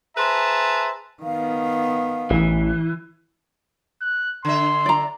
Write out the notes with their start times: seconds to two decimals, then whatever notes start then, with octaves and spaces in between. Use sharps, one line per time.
0.17 G#4 B4 C5 E5 A5 A#5
1.23 D#3 B3 F5
2.30 A1 E3
4.02 F#6
4.45 D3 E5 C6
4.86 D5 A#5